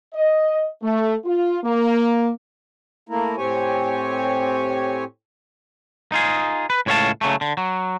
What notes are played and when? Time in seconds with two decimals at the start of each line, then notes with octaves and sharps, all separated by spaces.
0.13 D#5
0.82 A3
1.25 F4
1.64 A#3
3.09 A3 A#3 E4 A#4
3.37 A2 C4 G4 C#5 G#5
6.12 D#4 F4 G#4
6.70 B4
6.86 C#2 A2 C#5 D5 F5 A5
7.21 C#3 F#3 A3
7.41 D3
7.57 F#3